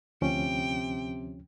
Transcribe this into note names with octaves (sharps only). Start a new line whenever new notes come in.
D2 C3 F3 C#4 G5